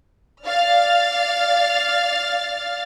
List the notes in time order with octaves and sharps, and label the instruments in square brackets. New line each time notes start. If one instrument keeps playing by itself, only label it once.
[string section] D5 F5 F6 A6